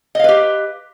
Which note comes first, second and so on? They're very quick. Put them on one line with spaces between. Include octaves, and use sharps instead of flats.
D#5 F5 B4 G4